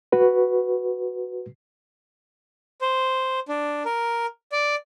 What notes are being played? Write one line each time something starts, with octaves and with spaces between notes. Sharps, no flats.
F#4 B4
C5
D4
A#4
D5